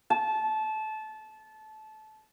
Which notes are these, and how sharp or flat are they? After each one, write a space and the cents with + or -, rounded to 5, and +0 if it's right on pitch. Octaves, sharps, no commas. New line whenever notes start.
A5 -20